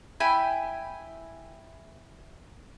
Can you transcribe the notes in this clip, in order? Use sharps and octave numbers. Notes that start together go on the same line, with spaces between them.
E4 G5 G#5 B5